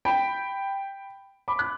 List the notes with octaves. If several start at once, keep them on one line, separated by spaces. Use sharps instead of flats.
G5 B5
B5 D6
F#6